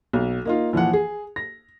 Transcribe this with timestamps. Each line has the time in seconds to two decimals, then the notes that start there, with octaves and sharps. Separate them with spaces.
0.13 B1
0.45 A#3 D#4 F4
0.73 A#1 E3 F3 F#5
0.93 G#4
1.36 A#6